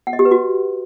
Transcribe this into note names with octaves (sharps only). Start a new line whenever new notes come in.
F#5
D#5
G4
B4
F#4